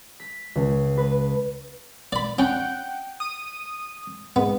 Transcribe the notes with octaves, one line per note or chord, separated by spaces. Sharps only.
B6
C#2
B4
D5 B5
C#4 D4 F#5 G5
D#6
G#2 B3